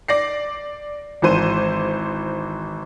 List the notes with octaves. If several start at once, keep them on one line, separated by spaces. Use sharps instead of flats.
D5 A#6 C7
G#1 E3 C5 D#7